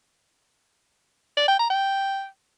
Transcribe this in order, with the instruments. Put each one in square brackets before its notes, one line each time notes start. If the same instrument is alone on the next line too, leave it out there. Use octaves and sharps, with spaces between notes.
[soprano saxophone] D5
G5
A#5
G5